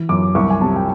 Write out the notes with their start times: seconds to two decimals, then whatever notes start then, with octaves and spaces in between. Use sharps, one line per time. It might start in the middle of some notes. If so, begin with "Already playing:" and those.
Already playing: E3
0.09 F#2 D6
0.35 C2 C#6
0.50 G#5
0.61 C3 A5
0.76 G5